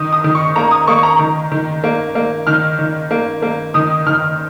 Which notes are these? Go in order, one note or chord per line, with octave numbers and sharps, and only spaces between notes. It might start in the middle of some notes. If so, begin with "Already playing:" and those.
Already playing: D#3 D#6
D#6
D#3
C#6
A#3 A#5
D#6
A#3 C#6
A#5
D#3
D#3
A#3
A#3
D#3 F6
D#3
A#3
A#3
D#3 D#6
D#3 F6